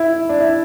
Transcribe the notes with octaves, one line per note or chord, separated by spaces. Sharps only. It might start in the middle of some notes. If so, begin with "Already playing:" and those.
Already playing: E4
D4
E4